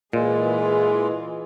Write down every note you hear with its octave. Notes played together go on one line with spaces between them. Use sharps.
A#2 E3 G#3 F4 G#4